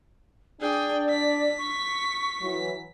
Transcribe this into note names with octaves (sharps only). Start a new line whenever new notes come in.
D4 G#4 D5 G5
B6
C#6
E3 F#3